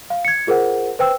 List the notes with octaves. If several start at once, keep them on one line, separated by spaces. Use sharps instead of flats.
F5
G#6 C#7
F4 G#4 A#4 C5 F#5
B4 C5 G5 E6